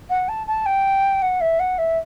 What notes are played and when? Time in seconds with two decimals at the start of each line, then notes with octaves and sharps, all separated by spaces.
0.09 F#5
0.28 A5
0.47 A5
0.66 G5
1.22 F#5
1.41 E5
1.59 F#5
1.78 E5